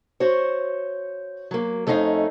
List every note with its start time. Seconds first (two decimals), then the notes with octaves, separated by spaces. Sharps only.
0.20 F#4 C5 C#5
1.51 F#3 A#3
1.87 F2 A3 C#4 D#4 F5